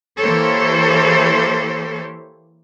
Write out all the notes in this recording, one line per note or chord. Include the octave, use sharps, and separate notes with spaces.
E3 A#3 G4 A4 C5 C#5